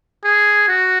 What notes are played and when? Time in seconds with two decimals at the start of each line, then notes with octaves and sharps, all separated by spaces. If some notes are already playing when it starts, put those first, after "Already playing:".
0.24 G#4
0.68 F#4